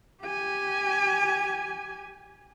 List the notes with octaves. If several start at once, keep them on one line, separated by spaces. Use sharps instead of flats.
G4 G#5